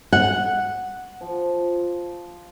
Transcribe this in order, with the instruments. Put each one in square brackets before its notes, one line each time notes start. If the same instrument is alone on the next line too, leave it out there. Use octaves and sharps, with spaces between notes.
[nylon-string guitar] F#5
[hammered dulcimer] F3